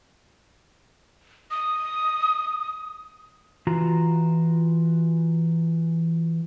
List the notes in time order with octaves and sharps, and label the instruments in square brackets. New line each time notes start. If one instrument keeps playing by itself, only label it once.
[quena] D#6
[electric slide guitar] E3 F4 F#4 A#5